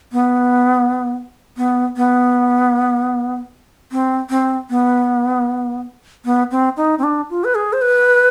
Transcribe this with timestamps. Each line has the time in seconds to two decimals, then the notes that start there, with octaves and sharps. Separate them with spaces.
0.12 B3
1.57 B3
1.96 B3
3.92 C4
4.30 C4
4.70 B3
6.25 B3
6.51 C4
6.77 D#4
6.98 C4
7.03 D4
7.30 F4
7.44 B4
7.55 G#4
7.73 C5
7.82 B4